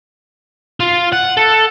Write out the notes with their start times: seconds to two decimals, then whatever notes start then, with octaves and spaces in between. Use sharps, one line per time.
0.80 F4
1.13 F#5
1.37 A4